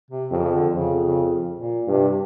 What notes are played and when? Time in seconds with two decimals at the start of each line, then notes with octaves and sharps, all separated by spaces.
0.10 C3
0.31 F2 C#3
0.52 D3
0.74 F2 C#3
1.02 C#3
1.59 A#2
1.87 G2 C3